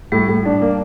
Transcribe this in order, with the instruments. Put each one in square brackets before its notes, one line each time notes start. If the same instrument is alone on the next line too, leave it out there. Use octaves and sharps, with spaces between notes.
[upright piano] A2 [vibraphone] G3
[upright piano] A2
D4
A#3